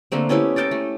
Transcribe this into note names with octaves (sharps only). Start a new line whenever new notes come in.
D3 A3 A#3 C4
B3 C#4 E4 G4
A4 A#4 G5 A5
A3